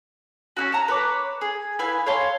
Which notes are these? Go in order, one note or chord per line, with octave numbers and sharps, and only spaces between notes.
C#4 D#4 F#4
A5 A#5
B4 C#5 D6
G#4
E4 B4 F5 G#5
C#5 F5 A5 C6